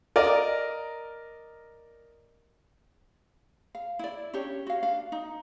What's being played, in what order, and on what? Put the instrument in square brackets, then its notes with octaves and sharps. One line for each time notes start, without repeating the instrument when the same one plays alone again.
[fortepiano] A#4 D5 D#5
[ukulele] F5
E4 D5
C#4 D4 G4 C#5
F#4 F5
D4 F5
D#4